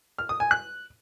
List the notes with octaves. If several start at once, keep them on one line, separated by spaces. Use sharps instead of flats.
F6
D#6
G#5
F#6